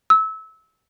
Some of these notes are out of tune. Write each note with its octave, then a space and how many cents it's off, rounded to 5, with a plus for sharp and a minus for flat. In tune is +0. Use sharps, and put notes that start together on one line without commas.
E6 -25